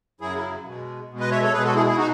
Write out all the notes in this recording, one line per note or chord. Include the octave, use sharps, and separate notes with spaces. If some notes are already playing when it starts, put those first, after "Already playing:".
F#2 C#3 F#3 E4 G#4
E4
B2 G#3
B2 G#3
B4 D#5
C#5 E5
A4 C#5
B2 G#3 G#4 B4
F#4 A4
E4 G#4
E4 G#4
B2 D#4 F#4